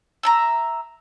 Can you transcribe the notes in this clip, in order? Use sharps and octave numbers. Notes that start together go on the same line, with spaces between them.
E5 A5 A#5